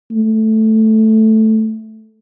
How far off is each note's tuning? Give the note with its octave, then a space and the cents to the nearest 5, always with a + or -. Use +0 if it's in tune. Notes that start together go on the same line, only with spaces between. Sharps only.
A3 -5